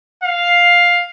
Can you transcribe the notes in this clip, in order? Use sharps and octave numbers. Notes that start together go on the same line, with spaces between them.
F5